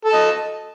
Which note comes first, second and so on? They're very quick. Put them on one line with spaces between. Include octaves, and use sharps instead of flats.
A4 A5 D#5